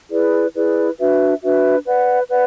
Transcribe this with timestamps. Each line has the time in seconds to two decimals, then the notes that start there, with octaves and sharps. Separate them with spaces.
0.11 E4 G#4 B4 D5
0.55 E4 G#4 B4 D5
0.98 D4 F#4 B4 E5
1.42 D4 F#4 B4 E5
1.85 B4 D5 F#5
2.29 B4 D5 F#5